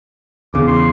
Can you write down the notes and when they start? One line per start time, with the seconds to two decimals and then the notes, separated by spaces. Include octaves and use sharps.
0.54 E2 C#3 D6
0.67 C6